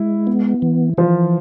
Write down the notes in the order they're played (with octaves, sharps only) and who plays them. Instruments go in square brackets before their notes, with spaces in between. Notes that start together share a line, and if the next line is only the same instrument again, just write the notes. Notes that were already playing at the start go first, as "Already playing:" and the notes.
Already playing: [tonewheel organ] G#3 [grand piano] E4
[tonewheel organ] B3
E3
[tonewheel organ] E3 [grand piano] F3 F4